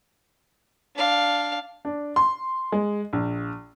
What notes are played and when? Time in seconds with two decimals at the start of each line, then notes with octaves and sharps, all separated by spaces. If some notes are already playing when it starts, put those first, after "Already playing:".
0.96 D4 F5
1.85 D4
2.16 C6
2.72 G#3
3.13 A#1